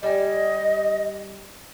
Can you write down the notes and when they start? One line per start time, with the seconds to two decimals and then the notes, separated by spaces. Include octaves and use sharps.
0.03 G3 D5 D#5 G#5